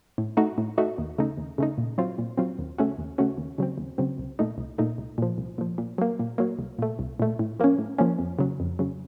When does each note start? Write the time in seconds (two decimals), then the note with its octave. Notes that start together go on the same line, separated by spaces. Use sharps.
0.18 A2
0.37 A3 D#4 F#4
0.58 A2
0.78 A3 D#4 F#4
0.98 D#2
1.18 C#3 A3 D#4
1.37 D#2
1.58 C#3 A3 D#4
1.78 A#2
1.98 F#3 C4 F4
2.18 A#2
2.38 F#3 C4 F4
2.59 D#2
2.78 C#3 A3 C#4 F#4
2.98 D#2
3.18 C#3 A3 C#4 F#4
3.38 D#2
3.58 C#3 F#3 C4
3.78 D#2
3.98 C#3 F#3 C4
4.18 C2
4.39 A#2 A3 D#4
4.58 C2
4.78 A#2 A3 D#4
4.98 C2
5.18 A#2 F3
5.38 C2
5.58 A#2 F3
5.78 A#2
5.98 F#3 A#3
6.19 A#2
6.38 F#3 A#3
6.59 C2
6.78 A#2 A3
6.99 C2
7.20 A#2 A3
7.39 A2
7.60 F3 A#3 C#4
7.78 A2
7.99 F3 A#3 C#4
8.19 F2
8.39 C#3 F#3
8.60 F2
8.79 C#3 F#3